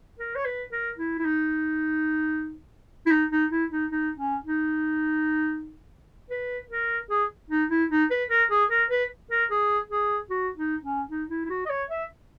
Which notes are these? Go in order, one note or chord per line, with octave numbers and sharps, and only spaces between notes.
A#4
C#5
B4
A#4
E4
E4
D#4
E4
D#4
D#4
E4
D#4
D#4
C#4
D#4
B4
A#4
G#4
D#4
E4
D#4
B4
A#4
G#4
A#4
B4
A#4
G#4
G#4
F#4
D#4
C#4
D#4
E4
E4
F#4
D#5
C#5
E5